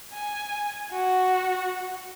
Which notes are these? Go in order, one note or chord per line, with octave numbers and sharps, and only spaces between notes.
G#5
F#4